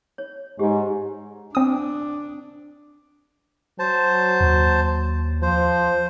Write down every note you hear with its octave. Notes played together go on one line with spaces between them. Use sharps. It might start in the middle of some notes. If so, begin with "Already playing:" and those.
C#5
G#2 G4
C4 D4 D#6
F#3 C5 A5
D#2
F3 C5